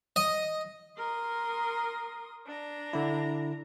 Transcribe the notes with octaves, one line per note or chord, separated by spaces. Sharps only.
D#5
A#4 C6 D#6
D4 A#5
D3 E4